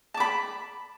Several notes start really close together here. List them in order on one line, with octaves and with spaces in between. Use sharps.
A5 D6 B5